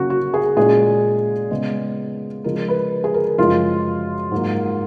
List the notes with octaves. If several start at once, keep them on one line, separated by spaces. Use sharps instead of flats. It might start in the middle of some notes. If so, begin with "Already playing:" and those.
Already playing: C#3 F#3 A#3 C#4 F#4
F#4
G#4
A#2 G#3 C#4 G#4
C#3 G#3 B3
C#3 F3 G#3 A#4
B4
G#4
A#4
F#2 C#3 F3 G#3 F4
G#2 F#3 A#3